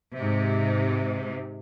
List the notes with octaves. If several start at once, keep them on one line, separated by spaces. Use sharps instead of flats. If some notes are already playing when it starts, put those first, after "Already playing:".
G#2 C3